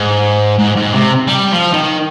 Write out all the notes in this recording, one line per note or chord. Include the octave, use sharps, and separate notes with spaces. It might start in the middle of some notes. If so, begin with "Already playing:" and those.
Already playing: G#2
G#2
G#2
C3
G3
F3
D#3